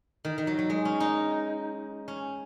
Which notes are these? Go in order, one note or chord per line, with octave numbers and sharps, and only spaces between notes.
D#3
D#3
F#3
F#3
G#3
C#4
D#4
C#4